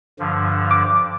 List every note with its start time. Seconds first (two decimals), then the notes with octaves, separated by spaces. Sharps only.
0.19 G2 D3 F3
0.71 D6